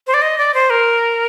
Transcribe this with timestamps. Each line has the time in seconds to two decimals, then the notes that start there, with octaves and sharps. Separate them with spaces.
0.07 C5
0.14 D5
0.22 D#5
0.38 D5
0.54 C5
0.70 A#4